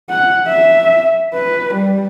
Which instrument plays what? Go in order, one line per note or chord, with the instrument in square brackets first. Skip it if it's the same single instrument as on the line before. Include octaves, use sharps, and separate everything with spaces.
[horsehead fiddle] F#5
E5
B4
G3